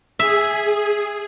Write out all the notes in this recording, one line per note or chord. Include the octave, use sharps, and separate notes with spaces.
G#4 E5